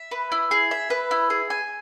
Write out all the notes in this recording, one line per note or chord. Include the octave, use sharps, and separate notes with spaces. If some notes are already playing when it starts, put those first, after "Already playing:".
Already playing: E5
B4
E4
G#4
E5
B4
E4
G#4
G#5